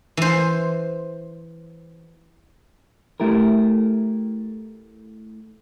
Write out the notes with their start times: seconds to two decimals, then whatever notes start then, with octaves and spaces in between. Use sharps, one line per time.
0.17 E3 C5
3.20 A3 E4 G4 A#4